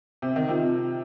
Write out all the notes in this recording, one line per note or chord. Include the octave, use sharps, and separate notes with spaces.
C3
D#3
C3 F3